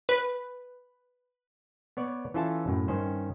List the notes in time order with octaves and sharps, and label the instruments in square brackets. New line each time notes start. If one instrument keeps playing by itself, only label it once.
[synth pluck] B4
[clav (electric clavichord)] B3 C#5 D5
E3 C#4 F4 A4 E5 A5
F#2 A2
G2 D#3 C#4 C5